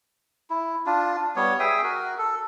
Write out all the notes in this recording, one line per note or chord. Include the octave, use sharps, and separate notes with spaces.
E4
D4 F4
G3 B3 C#5
G#4 E5 G5 D#6
F#4 A#4
A4